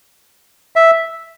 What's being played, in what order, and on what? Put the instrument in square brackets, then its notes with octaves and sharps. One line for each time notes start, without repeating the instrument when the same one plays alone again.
[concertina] E5